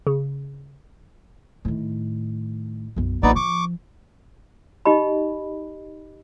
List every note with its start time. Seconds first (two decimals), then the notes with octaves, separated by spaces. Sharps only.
0.07 C#3
1.65 A2 D#3
2.96 B1 F#2
3.23 A#1 B3 D#4 D5
3.36 F3 C#6 D6
4.85 D#4 G4 D#5 B5